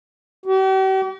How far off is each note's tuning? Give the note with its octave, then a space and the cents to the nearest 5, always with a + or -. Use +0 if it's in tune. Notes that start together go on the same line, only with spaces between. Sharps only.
G4 -45